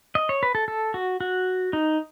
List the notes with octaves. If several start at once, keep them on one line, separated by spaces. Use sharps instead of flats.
D#5
C#5
B4
A4
A4
F#4
F#4
D#4